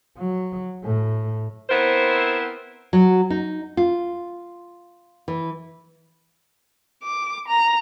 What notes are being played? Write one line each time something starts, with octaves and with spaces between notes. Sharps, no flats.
F#3
A2
B3 C4 E4 A#4 C5
F#3
D#4
F4
E3
D6
A#5